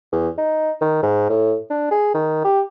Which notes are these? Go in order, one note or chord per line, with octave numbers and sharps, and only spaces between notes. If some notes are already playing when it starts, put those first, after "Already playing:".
E2
D#4
D#3
G#2
A2
D4
G#4
D#3
G4